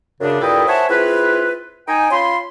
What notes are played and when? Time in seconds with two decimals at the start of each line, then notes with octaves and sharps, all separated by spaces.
0.20 F#2 C#3 D4
0.41 G2 A#2 E4 A4 D#5 G5
0.68 C5 C#5 E5 F#5 G#5 A5
0.89 C4 E4 F4 G#4 B4
1.88 D#4 G5 G#5
2.11 C#4 F4 B5 C6